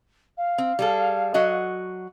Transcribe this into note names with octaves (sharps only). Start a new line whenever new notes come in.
F5
C4
G3 G#4 A4
F#3 F#4 D#5